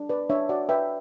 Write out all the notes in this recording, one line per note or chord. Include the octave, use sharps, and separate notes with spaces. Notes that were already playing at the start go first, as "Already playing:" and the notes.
Already playing: D4
B4 D5
D4 C#5 E5
F#4 D5 F#5
B4 E5 G5